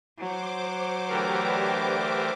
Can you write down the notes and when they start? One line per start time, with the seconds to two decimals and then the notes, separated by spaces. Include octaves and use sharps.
0.19 F#3 C5 D6
1.09 D3 E3 A3 G4 A#4 B4